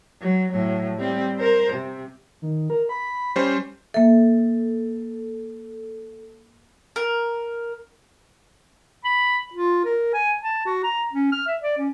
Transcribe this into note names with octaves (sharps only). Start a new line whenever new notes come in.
F#3
A2 F#3
G3 C4
A#4 C5
C3
D#3
A#4
B5
G3 C#4 C5
A#3 A4 E5
A#4
B5
F4
A#4
G#5
A5
F#4
A#5
C#4
F6
E5
D5
C#4